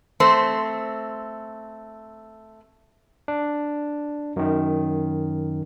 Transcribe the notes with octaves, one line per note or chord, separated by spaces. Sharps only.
A3 C4 C5
D4
F#2 D#3